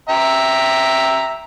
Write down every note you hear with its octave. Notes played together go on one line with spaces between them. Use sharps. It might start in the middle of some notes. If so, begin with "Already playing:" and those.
E5 G5 A#5